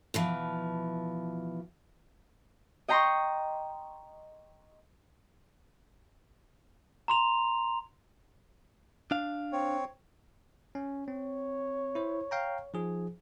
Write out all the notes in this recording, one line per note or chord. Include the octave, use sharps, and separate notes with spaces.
B2 E3 F3
D#5 G5 A#5 C6 C#6
A#5 C6 F7
D4 F5
C4 C#5
C#4
C4 C#5
E4 C5
F5 G5 A#5
F3 D#4 G#4